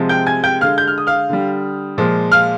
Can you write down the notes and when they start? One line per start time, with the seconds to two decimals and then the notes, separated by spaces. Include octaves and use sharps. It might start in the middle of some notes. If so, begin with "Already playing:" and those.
Already playing: C3 F3 G#3
0.09 G5 G6
0.26 G#5 G#6
0.44 G5 G6
0.61 D3 G#3 F5 F6
0.78 G6
0.88 F6
0.98 D#6
1.07 F5 F6
1.30 D3 G3
1.98 A#2 F3 G#3
2.31 F5 F6